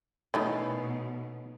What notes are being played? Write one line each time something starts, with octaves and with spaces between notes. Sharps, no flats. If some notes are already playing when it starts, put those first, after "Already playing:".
B2 D#3 E3 A3 C#4 D#4